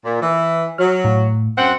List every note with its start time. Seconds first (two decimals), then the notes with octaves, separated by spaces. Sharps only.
0.04 A#2
0.20 E3
0.78 F#3 F6
1.04 A2
1.56 F#2 C4 F#5